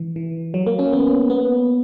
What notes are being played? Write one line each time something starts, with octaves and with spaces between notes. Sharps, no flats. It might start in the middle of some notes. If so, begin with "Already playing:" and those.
Already playing: E3
E3
F#3
A#3
C#4
B3
B3